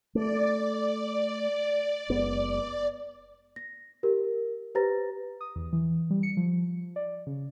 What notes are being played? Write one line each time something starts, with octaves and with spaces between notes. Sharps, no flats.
A3 D5
F#1 G#3 B3
A#6
G4 A#4
G4 B4 C5 A#5 A6 A#6
D#6
E2
E3
G3
C#7
F3
D5
C#3